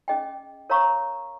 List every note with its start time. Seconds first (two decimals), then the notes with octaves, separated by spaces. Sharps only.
0.08 C#4 G#4 D#5 G5
0.70 A#4 C#5 F5 A#5 C#6